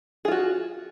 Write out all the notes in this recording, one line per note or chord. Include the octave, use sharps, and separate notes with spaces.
F4 F#4 G#4